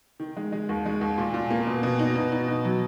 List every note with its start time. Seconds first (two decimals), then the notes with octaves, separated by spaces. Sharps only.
0.20 D#3
0.36 G#3
0.52 G#3
0.69 D#2
0.86 G#3
1.01 D#2
1.18 A#2
1.34 A#2
1.50 A#3
1.67 B2
1.83 B2
1.99 D#4
2.15 B2
2.32 D#4
2.48 B2
2.65 F#3